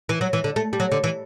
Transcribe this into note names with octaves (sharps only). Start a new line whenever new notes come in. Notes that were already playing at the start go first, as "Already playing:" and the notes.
E3
F#3
E3
D3
A3
G3
F#3
D3
E3